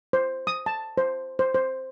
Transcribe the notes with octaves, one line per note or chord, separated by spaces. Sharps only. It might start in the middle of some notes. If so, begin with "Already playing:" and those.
C5
D#6
A5
C5
C5
C5